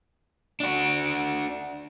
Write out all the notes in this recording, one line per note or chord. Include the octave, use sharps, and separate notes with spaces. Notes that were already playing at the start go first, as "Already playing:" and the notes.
D4 F#4